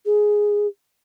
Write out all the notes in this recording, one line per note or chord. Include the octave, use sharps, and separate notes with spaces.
G#4